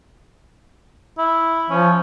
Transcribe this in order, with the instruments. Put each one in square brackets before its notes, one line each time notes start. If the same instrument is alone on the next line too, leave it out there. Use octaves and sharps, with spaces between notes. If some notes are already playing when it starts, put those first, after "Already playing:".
[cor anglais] E4
[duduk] F3 [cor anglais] C#4